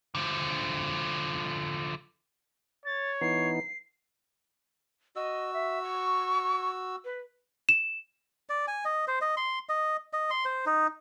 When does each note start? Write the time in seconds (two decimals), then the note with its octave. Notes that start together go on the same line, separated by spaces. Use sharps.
0.15 D3 F3
2.85 C#5 A6
3.21 E3 B3 D#4 C7
5.16 F#4 D#5 E6
5.53 E5
5.83 C#6
7.05 B4
7.69 E7
8.49 D5
8.68 G#5
8.85 D#5
9.08 C5
9.21 D#5
9.37 C6
9.69 D#5
10.13 D#5
10.30 C6
10.45 C5
10.66 D#4